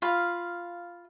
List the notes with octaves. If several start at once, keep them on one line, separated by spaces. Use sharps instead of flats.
F4 F5 B5